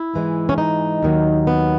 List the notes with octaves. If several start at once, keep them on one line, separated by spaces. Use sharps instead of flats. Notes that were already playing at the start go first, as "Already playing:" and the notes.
Already playing: E4
G#2 E3 G#3
C#4
D#4
D#2 D#3 F#3
B3